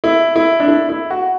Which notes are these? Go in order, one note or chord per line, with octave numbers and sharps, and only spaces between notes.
E4
E4
D4
E4
E4
F#4